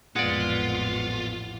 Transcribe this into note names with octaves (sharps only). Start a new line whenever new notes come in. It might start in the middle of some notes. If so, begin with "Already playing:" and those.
A1 F2 A#2 G#3 B3 F4 D5 F#5